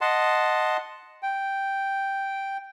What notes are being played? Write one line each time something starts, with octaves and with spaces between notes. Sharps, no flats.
D#5 F#5 A5 C6
G5